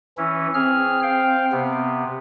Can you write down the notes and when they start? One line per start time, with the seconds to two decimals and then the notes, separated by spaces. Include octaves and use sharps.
0.18 E3 C#4 E4
0.54 C4 G#4 F6
1.03 F5 G5
1.52 C3 B3